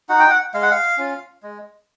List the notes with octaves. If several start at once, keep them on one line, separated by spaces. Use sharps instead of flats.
D#4 F#4 F#5
G5
F#5
G#3 F5
F#5
F5
C#4 F4
G#3